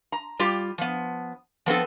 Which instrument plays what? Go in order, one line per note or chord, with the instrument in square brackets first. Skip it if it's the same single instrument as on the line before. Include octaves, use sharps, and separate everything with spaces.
[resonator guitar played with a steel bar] A#5
G3 F4 G4
F3 B3
F3 B3 C4 A4